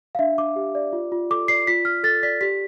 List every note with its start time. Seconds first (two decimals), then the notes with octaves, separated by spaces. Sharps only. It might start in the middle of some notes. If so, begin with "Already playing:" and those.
0.15 F5
0.19 D4 E5
0.38 D4 D6
0.56 G4
0.75 D5
0.93 F4
1.12 F4
1.30 A4 D6
1.48 D5 C7
1.67 F4 B6
1.85 F4 F6
2.03 A4 A6
2.23 D5 B6
2.41 G4 B6